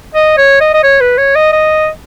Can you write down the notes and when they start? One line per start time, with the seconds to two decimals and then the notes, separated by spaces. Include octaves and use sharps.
0.15 D#5
0.38 C#5
0.61 D#5
0.74 D#5
0.83 C#5
1.01 B4
1.18 C#5
1.35 D#5
1.53 D#5